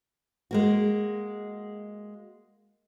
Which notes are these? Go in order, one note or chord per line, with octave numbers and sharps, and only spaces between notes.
G#3 A#3 F#4